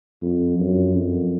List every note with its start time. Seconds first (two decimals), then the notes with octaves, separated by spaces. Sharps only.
0.22 F2
0.59 F#2
0.95 F2